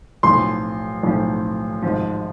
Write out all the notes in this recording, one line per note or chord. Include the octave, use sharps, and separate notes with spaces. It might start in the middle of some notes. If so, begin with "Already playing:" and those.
B1 A2 F3 C6
B1 A2 F3
G#1 G#2 F3